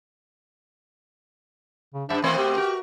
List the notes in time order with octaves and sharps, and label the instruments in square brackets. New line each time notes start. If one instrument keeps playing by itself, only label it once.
[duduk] C#3
[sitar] G2 E5 [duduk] D4
[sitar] B2 A3 C4 [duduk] E3
[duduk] G4
[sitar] F#4 A#4